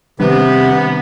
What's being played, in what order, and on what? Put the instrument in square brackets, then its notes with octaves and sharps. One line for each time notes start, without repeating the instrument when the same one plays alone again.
[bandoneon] C3 [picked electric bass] D#3 G3 D4 [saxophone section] B3